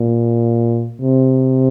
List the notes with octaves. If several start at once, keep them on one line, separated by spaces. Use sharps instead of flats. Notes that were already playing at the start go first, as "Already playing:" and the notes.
Already playing: A#2
C3